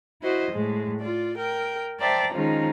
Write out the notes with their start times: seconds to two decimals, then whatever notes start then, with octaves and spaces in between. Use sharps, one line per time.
0.22 E4 F#4 C5 D#5
0.52 A2 G#3
1.01 F4 D5
1.38 A#4 G5
2.00 C5 D5 E5 G5 A5 A#5
2.33 D#3 F3 G#3 C#4 D#4